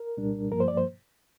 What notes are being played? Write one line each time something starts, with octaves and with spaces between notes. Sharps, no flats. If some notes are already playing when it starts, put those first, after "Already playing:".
Already playing: A#4
C2 A#2 G3 D4
G2 F3 A#3 A#4
C5
D5
C5